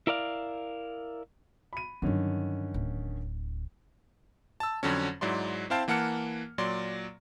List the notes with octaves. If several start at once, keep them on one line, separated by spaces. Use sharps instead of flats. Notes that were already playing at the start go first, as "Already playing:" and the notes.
E4 A#4 D5 F5
B5 D#7
G2 D3 D#3 F#3 C#4
D1
A5 E6
F2 D3 F#3 C#4
G#2 F#3 E4 D5 C6
C4 E4 C5 F5 G5 A5
E3 A#3 F#5 A5 F6 C#7
A#2 F#3 D5 C6